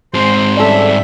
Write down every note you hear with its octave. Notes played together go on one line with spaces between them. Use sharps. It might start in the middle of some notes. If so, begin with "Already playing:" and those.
G#2 G#3 C4 C5
G3 C#4 A4 D5 E5